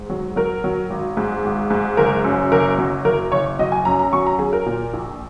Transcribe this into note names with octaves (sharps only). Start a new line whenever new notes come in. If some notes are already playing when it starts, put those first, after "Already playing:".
Already playing: G#2
F#3
F#3 A#4
F#3
G#1
G#2
G#1
G#2
F#1 A#4
F#2
F#1 A#4
F#3
F#1 A#4
F#1 C#5
F#3 D#5
G#5
F#2 A#5
A#5
F#3 C#6
A#5
F#3 G#4
A#4
A#2
A#1